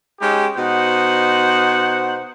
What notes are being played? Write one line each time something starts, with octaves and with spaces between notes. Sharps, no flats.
G#3 C#4 D#4 G4
B2 D#4 C5 F#5